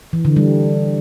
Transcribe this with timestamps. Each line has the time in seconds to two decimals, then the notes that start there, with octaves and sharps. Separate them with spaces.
0.13 E3
0.25 D3
0.36 G3